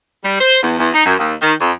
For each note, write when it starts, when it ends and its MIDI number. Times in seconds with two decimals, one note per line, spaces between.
0.24 0.37 55
0.40 0.59 72
0.63 0.75 40
0.78 0.90 40
0.94 1.04 63
1.06 1.15 42
1.19 1.34 39
1.42 1.53 51
1.60 1.72 41